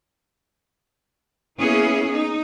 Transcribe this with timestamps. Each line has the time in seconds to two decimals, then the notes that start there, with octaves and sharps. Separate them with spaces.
1.59 A#3 B3 C#4 E4 G#4
2.12 D#4